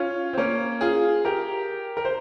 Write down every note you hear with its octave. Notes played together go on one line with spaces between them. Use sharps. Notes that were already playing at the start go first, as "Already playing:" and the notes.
Already playing: C#4 F4
C4
A#3 C#4
F4 G#4
G4 A#4
A#4
C5